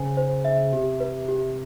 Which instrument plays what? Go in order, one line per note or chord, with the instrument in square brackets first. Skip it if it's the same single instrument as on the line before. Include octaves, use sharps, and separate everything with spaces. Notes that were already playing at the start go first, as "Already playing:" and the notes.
Already playing: [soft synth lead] C#3 [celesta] C5 G#5
[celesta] C5
E5
[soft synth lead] C3 [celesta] G4
[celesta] B4
G4